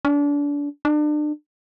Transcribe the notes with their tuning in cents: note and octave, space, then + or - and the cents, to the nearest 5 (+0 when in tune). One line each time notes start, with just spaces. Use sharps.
D4 -30
D4 +35